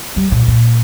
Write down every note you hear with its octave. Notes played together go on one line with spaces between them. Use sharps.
G3
A#2
A#2